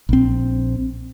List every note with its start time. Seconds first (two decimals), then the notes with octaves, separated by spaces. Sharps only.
0.09 A#1 C4